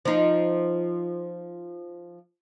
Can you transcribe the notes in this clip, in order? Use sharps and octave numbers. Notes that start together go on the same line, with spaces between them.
F3 D#4